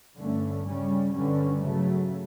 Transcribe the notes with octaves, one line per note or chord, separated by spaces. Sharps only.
G2 D3 A3 C#4
C#3 G3 C#4
G2 D3 G3 C#4
C#3 F#3 A3